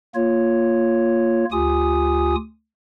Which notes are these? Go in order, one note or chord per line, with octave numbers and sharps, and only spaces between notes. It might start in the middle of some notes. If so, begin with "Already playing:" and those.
A#3 F4 C#5
D2 F4 G4 G#5 D#6